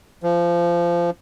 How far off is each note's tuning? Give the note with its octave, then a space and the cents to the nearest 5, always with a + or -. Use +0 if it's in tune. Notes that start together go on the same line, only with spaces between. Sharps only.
F3 -20